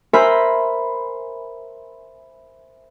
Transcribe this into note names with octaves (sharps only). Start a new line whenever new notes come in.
A#4 C5 E5 G#5 B5